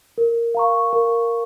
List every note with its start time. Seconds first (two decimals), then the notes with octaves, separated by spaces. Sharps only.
0.18 A#4
0.55 F5 A#5 C#6
0.93 A#4